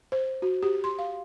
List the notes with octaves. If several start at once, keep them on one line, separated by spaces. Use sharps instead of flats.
C5
F#4
G4
C6
F5